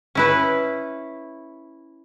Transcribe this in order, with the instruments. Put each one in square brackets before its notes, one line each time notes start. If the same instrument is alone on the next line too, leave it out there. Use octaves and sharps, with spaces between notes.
[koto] C#4 E4 B4